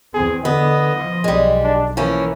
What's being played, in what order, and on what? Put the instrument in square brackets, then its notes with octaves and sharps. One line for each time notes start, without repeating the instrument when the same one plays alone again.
[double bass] E2 C4 [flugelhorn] G#4
[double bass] D3 [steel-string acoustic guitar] B3 [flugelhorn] D#5
[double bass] F3
[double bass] B1 [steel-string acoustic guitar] G3 G#3
[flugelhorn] D4
[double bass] E3 [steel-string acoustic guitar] F3 A#3 C#4 [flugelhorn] E4